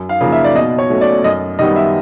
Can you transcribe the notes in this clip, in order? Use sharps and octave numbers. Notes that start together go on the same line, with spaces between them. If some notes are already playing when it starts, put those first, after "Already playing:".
Already playing: F#2
F5
C#3 F3 A#3
E5
D5
B2 D#5
C#5
F#3 A3 C#4
D5
F#2 D#5
D#3 G3 B3 D#5
E5